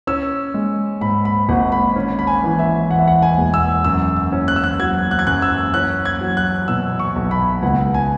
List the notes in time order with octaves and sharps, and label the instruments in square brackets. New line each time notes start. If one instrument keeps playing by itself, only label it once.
[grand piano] C#4 E6
G#3
G#2 B5
B5
G#1 F#5
B5
C#4
B5
G#5
E3
E5
E2 F#5
E5
F#5
G#5
E1
E6
F#2 E6
E6
C#4
F#6
E6
F#6
F#3 G#6
F#6
G#6
F#2 F#6
E6
C#4 F#6
G#6
F#3
F#6
B2 E6
C#6
B1
B5
C#2 F#5
G#5